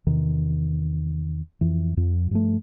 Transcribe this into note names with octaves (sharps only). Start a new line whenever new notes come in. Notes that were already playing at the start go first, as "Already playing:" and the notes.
E2 C3 D#3
F2 E3
F2 F3
G2 F3 A3